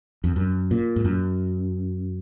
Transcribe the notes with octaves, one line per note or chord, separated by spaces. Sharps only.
F2
F#2
A#2
G#2
F#2